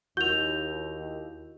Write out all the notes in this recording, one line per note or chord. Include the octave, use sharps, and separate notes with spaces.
D#2 E4 F#4 A#4 G6 F7